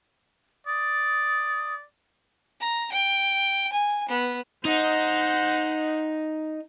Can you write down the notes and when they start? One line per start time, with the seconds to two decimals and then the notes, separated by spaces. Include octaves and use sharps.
0.67 D5 D#6
2.60 A#5
2.92 G5
3.73 G#5
4.09 B3
4.65 D#4 C5 F#5